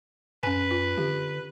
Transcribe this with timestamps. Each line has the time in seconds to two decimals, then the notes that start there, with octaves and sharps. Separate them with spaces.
0.43 F#2 C#4 B4 G#5
0.71 F4
0.97 D3 G4